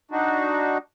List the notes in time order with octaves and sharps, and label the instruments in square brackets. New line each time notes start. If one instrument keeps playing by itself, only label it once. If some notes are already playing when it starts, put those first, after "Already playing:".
[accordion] D4 D#4 F#4